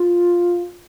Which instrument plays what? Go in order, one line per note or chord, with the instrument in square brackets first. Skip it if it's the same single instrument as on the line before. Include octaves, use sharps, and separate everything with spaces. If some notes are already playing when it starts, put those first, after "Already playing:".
Already playing: [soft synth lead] F4